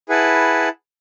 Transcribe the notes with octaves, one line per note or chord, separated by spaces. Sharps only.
E4 G#4 B4 F#5 A5